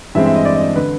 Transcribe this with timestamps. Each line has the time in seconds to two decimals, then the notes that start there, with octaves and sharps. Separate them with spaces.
0.15 G2 E3 G#3 C4 E5
0.26 E5
0.36 D#5
0.45 D5
0.55 D#5
0.61 D5
0.76 D3 B4